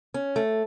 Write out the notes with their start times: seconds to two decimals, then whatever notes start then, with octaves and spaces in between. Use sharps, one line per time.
0.14 C#4
0.36 A3